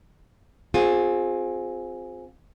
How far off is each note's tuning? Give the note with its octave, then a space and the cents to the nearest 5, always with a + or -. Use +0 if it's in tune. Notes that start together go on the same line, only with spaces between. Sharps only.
C4 +0 F4 +30 G#4 +0